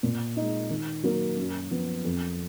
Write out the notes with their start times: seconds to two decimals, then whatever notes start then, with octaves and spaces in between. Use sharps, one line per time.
0.03 A#2
0.36 G#3 D#4
0.70 D#3
1.03 F#3 A#3
1.37 F#2
1.70 F3 B3
2.05 F2